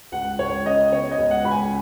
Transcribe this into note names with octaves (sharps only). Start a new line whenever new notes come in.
C#2 F#5
C#2 C#5
C#3 D#5
B3 C#5
D#5
C#2
F#5
C#2 B5
G#5